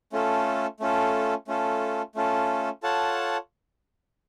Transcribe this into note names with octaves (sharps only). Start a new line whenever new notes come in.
A3 C#4 F4 A4
A3 C#4 F4 A4
A3 C#4 F4 A4
A3 C#4 F4 A4
F4 A4 C#5 F#5 A5